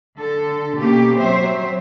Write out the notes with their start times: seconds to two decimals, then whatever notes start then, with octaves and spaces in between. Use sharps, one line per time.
0.18 D3 A4
0.77 B2 A#3 C#4 G4
1.20 F#3 C4 C5 E5